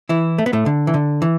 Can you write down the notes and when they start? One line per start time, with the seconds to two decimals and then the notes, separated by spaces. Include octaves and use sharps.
0.09 E3 E4
0.38 A3
0.46 B3
0.53 A2 A3
0.66 D3
0.87 E3
0.94 D3
1.22 E3